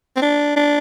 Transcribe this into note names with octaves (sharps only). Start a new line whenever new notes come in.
C4
D4
D4